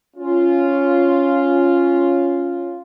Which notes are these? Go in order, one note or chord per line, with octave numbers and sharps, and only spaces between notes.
C#4 F4